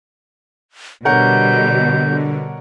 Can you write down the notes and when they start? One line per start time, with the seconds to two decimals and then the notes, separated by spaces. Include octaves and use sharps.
1.05 B2 D3 G3 A#4 C#5 F#5 G6